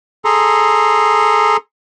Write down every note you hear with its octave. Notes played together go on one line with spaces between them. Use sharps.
G#4 A4 A#5 C6